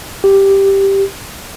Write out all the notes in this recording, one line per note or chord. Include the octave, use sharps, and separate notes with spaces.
G4